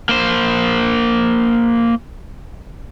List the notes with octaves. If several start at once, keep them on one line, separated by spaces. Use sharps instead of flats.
A#3 C5